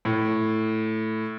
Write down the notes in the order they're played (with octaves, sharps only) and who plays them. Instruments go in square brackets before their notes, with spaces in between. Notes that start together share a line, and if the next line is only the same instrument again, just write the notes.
[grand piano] A2